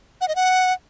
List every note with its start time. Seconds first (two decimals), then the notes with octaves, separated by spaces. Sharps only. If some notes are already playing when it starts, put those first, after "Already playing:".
0.21 F#5
0.28 D#5
0.36 F#5